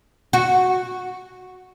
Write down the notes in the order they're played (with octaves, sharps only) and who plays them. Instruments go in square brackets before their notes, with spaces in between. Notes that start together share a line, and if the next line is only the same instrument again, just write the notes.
[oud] F#4